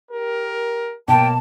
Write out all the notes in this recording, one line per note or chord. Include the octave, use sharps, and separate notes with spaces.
G4 A#4
B2 F#3 A#3 G5 A5